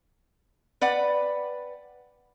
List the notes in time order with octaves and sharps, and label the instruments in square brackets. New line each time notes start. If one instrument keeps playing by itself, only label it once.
[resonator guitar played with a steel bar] B4 D5 F#5 G5